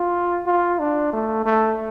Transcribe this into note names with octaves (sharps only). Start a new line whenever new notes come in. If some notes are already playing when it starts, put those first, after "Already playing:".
Already playing: F4
F4
D4
A3
A3